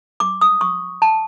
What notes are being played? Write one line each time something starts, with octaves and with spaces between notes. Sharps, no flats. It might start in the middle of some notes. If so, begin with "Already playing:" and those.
D6
D#6
C#6
A5